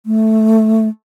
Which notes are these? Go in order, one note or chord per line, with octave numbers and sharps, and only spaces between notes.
A3